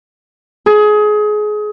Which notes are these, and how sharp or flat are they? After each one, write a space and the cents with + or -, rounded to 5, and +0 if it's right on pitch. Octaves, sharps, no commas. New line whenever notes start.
G#4 +25